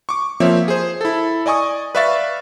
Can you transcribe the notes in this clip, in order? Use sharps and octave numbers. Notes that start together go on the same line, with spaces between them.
C#6 D6
F3 A#3 C4 C#5 E5
G#4 C5
E4 A4
D5 D#5 G#5 C#6 D#6
B4 D5 E5 F5 C#6 A6